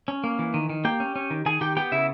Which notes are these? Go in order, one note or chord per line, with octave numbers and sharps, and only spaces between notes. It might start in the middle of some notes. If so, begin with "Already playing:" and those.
C#4
A#3
E3
D#3
D#3
A#3 G4 G5
C#4
C#4
D#3
D#3 G#4 G#5
D#3 G4 G5
B3 G4 G5
C#3 E4 E5